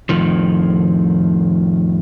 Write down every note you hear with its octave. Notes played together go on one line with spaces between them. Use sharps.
F2 A2 D#3 F3